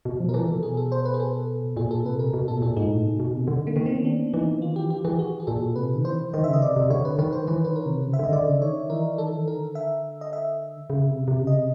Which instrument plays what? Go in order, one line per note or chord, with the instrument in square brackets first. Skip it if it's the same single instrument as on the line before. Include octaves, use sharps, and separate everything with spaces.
[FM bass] B2
F3
[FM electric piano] A#4
[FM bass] E3 [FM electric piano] A4
[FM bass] B2
[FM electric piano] G#4
A4
C5
B4
G#4
A4
[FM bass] A#2 [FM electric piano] G#4
[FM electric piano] A4
[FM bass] C3 [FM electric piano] B4
[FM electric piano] A#4
[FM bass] B2
[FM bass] A#2 [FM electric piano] A4
[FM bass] A#2 [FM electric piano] G#4
[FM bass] G#2 [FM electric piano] D#4
[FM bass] A2
B2
B2
C3
D3
[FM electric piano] A#3
[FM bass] D#3 [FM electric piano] B3
[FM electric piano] C4
C#4
D4
[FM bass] E3 [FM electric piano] D#4
[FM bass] D#3 [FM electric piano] F4
[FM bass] E3 [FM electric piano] G4
[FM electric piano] G4
[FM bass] E3 [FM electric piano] G#4
[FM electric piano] F#4
G#4
[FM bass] A#2 [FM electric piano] A4
[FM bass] C3 [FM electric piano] B4
[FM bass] D#3
[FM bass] E3 [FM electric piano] C5
[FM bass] D#3 [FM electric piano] D#5
[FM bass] C#3 [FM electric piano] E5
[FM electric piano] D#5
[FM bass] C3 [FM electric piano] D5
[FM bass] C3
[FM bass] D3 [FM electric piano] C#5
[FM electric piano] B4
[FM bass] D#3 [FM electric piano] B4
[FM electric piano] C5
[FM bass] E3 [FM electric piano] B4
[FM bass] D#3 [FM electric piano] B4
[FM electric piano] A#4
[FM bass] C3
C#3
[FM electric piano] E5
[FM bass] D3
[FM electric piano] D#5
[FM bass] D3 [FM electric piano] D5
[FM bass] C#3
[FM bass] D#3 [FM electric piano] C#5
[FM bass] E3 [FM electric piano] A#4
[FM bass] D#3 [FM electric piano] A4
[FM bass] E3
D#3
[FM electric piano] A#4
[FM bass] D3
[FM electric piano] E5
D#5
E5
[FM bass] C#3
C3
C3
C#3
[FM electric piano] D#5
[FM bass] C3